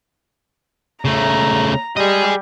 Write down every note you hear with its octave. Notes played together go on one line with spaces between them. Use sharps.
C#3 A3 A#5
G3 G#4 D#5